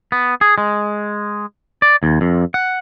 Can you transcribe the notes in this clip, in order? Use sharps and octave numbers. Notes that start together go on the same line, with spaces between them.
B3
G#4
G#3
D5
D#2
F2
F#5